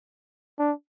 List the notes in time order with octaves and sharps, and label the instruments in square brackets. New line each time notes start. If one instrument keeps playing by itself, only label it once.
[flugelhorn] D4